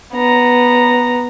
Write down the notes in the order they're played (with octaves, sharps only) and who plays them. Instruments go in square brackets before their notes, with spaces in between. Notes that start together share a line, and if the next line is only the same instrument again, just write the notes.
[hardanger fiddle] B3 A#5